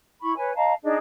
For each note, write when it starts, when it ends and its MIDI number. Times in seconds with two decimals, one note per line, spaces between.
0.21 0.32 64
0.21 0.32 83
0.21 0.32 85
0.35 0.52 71
0.35 0.52 73
0.35 0.52 80
0.55 0.73 75
0.55 0.73 77
0.55 0.73 81
0.55 0.73 82
0.83 0.98 62
0.83 0.98 63
0.83 0.98 68
0.83 0.98 75